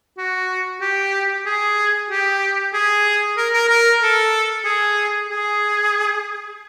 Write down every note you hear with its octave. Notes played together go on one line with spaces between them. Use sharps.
F#4
G4
G#4
G4
G#4
A#4
A#4
A#4
A4
G#4
G#4